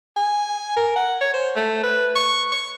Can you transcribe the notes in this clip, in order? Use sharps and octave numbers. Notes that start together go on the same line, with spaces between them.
G#5
A#4
F#5
C#5
C5
A3
B4
C#6
C#6